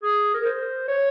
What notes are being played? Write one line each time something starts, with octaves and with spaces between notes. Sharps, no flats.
G#4
A#4
C5
C#5